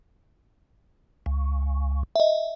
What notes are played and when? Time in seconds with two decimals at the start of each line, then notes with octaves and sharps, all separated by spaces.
1.26 C#2
2.16 D#5 E5